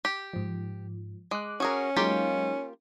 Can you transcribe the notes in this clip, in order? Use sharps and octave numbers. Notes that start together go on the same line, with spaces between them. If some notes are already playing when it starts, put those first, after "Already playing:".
G4
G#2 F3
G#3 D6 F#6
C#4 F#4 G#4 A#4
F#3 G#3 A#3 D#4 F4 G4